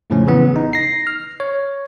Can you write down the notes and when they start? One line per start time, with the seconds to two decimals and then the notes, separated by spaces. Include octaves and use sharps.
0.10 F2 A2 C#3 F3 A3 C#4
0.27 C#3 E3 B3
0.52 A1 D#4
0.73 A#6 C7
1.07 F6
1.40 C#5